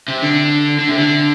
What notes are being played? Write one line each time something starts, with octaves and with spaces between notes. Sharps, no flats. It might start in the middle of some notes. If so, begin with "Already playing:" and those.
C3
D3
D3
C3
D3